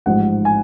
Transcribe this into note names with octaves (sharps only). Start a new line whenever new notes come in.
A1 G#2 F3 G#3 F#5
G#5